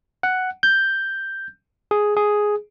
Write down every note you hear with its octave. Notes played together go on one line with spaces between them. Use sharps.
F#5
G6
G#4
G#4